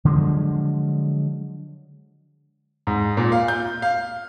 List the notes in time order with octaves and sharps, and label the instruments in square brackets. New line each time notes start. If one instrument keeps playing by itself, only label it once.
[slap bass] D3 F3 F#3 G#3
[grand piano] G#2
A#2
F5
G6
F5